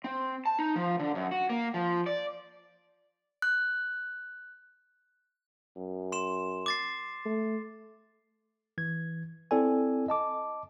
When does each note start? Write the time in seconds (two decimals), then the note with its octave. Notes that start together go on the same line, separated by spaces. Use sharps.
0.04 C4
0.46 A5
0.59 D#4
0.76 F3
0.99 D3
1.15 F#2
1.32 F#4
1.50 A#3
1.74 F3
2.06 D5
3.42 F#6
5.76 F#2
6.12 C6 E7
6.66 D6 A6 C7
7.26 A3
8.78 E3 G#6
9.51 C4 E4 A4 D5 G#5
10.08 D#5 A5 D6